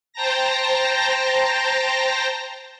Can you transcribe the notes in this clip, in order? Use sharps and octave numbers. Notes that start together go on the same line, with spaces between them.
C5 G5 A5 A#5 A#6